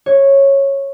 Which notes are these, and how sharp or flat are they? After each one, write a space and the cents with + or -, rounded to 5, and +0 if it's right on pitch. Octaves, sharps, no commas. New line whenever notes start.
C#5 -10